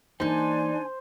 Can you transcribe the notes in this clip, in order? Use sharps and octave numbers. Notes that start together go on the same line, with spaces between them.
E3 A#3 D4 D#4 C5 G#5